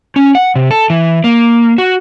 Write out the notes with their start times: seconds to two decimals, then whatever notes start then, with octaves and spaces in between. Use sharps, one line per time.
0.16 C#4
0.35 F#5
0.56 C3
0.71 A4
0.90 E3
1.24 A#3
1.78 F#4